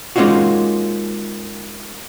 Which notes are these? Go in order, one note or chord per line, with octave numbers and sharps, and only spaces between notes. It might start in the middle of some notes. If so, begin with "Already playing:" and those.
G#3 A#3 C#4 D#4 F4 F#4